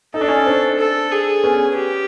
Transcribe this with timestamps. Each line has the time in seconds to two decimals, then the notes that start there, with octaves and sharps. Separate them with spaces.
0.14 D#4 A4
0.21 D4
0.28 C#4 D#4
0.46 C4 D4
0.79 A4
1.11 G#4
1.44 B3 C#4
1.75 G4